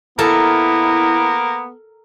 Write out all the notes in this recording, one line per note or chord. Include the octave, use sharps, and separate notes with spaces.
A#3 B3 E4 A4 A#4 A5